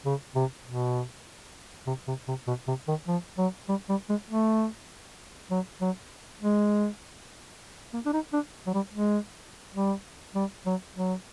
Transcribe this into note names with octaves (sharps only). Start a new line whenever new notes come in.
C#3
C3
B2
C3
C3
C3
B2
C3
D#3
F3
F#3
G3
G3
G#3
A3
F#3
F#3
G#3
A#3
D4
D#4
D4
F#3
G3
G#3
G3
G3
F#3
F#3